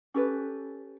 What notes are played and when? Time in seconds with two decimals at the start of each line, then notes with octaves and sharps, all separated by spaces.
0.14 C#4 G4 A4 B4